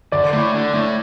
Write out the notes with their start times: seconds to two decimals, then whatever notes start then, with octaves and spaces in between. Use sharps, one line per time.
0.12 D3 D5
0.33 A3 E4
0.54 D3
0.73 A3 E4